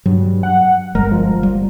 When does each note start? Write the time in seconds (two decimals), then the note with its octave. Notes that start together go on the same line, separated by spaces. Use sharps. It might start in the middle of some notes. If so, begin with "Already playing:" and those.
0.06 G2 F#3
0.43 F#5
0.95 G1 G3 G#3 A#4
1.11 F3
1.43 G3